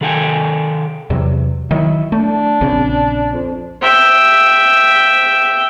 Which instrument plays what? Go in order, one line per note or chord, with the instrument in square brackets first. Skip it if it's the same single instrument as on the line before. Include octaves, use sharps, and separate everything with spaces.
[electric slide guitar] D#3 G#4 A4 C#5 G5 G#5
[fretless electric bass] E2 C3 F#3
[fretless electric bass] D#3 F#3 [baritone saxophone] E4
[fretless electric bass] A3 [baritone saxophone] D4
[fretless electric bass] A#1 C#3 C4
[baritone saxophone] F2
[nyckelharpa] E5 G5